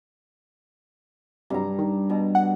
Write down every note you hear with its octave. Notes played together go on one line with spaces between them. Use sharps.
G2 C3 F#3 A#5
D#3
B2
F#5